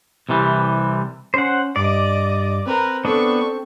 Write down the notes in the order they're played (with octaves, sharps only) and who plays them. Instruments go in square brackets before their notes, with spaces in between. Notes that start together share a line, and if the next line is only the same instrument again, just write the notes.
[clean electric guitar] C2 C3 E3 G3
[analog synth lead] C#4 [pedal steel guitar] C5 F#5
[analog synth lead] G2 [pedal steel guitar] D5 [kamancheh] D#5 D6
[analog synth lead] C4 [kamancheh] A#4 B4
[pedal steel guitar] B3 D4 [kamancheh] A4 C#6